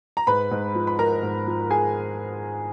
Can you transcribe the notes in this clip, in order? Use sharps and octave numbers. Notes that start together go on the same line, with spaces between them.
A#5
G#2 B4 B5
G#2
F3
B5
F3 A#4 A#5
G#2
F3
G#4 G#5